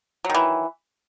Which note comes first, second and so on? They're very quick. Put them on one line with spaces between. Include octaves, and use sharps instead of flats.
F#3 D#3 E3